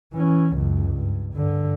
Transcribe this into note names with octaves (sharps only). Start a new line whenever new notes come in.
E3 C#4
C#2 F#2
G2
G2 D3